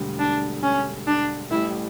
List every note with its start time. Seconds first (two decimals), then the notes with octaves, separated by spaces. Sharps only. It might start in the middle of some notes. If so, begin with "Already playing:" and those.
Already playing: E1 D2 D3 G3
0.19 D4
0.63 C#4
1.07 D4
1.50 A1 A2 G3 E4